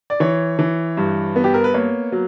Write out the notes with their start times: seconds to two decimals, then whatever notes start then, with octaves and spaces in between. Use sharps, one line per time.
0.10 D5
0.20 E3 C#5
0.59 E3
0.97 G2
1.36 B3
1.44 G4
1.54 A#4
1.64 B4
1.74 A#3 C#5
2.12 F#3